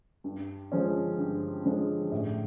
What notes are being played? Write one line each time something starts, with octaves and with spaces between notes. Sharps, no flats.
G2
D3 F3 G#3 C#4
G2
D3 F3 G#3 C#4
A2